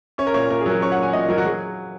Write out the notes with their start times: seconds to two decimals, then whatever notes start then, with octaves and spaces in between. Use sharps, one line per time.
0.18 C#4 C#5
0.27 A#4
0.34 A#2 C#5
0.50 A#2 A#4
0.61 G#4
0.66 F#3 A#4
0.82 C#4 C#5
0.92 F#5
0.98 A#2 G#5
1.13 A#2 D#5
1.29 F#3 A#4
1.38 F#4
1.45 F#3 G#4